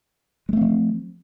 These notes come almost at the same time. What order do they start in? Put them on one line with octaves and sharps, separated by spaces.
G#3 A3 C4 F3